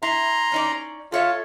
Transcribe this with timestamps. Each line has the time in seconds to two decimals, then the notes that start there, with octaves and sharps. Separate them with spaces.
0.03 E4 A#5 C6
0.52 C#4 D#4 D5
1.12 F4 A4 C#5 E5